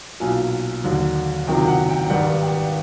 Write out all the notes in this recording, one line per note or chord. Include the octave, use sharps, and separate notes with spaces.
B1 A#2 F#3 G#5
D#2 D3 F#3
F#1 F2 C3 D#3 F#3 G5
F#5
G5
G#1 G2 D#3 G3 F#5
G5